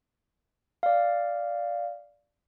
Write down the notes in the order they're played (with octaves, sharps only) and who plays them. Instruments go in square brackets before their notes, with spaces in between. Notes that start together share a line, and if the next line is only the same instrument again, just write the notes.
[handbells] D5 F5